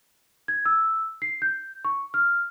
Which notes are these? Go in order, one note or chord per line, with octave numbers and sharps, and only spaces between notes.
G#6
E6
C7
G6
C#6
F6